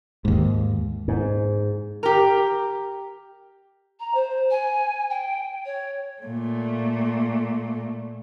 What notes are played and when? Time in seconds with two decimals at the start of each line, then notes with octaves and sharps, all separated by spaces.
0.25 D#2 G#2
1.08 G#2
2.03 G4 A#4
4.00 A#5
4.15 C5
4.51 G#5
5.10 G5
5.66 C#5
6.22 A#2 A3